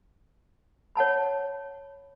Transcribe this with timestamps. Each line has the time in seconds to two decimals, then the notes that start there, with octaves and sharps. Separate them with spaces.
0.95 C#5 F#5 A5 B5